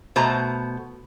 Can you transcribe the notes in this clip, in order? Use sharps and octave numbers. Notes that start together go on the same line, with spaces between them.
B2 A3 C5 A5 A#5